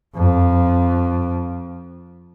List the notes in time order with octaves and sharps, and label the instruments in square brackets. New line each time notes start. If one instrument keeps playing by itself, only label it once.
[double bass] F2